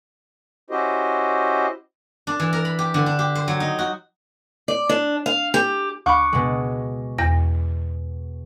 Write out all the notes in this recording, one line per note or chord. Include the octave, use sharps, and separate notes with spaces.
C#4 E4 F#4 G4 C5 D#5
D4
E3
A#4
B5
G4
D3
D4
G4
C5
F#3
D#4
F#4
D5
D4
F5
G4
D2 B5 C#6 D6 F#6
B2 G#3
E2 A#6